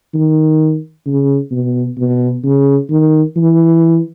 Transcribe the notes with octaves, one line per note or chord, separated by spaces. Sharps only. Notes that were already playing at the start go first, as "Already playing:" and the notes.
D#3
C#3
B2
B2
C#3
D#3
E3